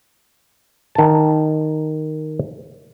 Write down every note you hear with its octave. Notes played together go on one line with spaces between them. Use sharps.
D#3 A5